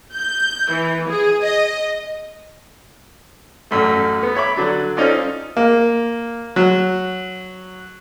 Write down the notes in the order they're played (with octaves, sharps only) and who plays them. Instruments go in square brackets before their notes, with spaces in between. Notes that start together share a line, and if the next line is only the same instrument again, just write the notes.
[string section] G6
E3
G#4
D#5
[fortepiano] A1 F#2 A3
B3
C#5 E5 B5 D6
D3 F#3 D4
C4 C#4 D#4 F4 A4 D5
A#3
F#3